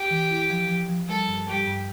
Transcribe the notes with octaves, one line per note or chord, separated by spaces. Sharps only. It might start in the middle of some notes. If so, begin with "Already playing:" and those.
Already playing: G4
E3
E4
F3
F3
F3
G3 A4
G2
G3 G4
G2